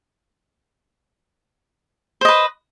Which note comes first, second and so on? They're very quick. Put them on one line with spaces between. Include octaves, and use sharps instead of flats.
C5 D#5 B4